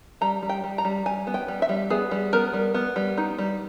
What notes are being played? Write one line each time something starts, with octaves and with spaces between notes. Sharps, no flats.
G3 A#5
G3
G5
G3
A#5
G3
G3 G#5
B3
G5
G3
E5
G3
B3 G#4
G3
B3 A#4
G3
B3
G3
D#4
G3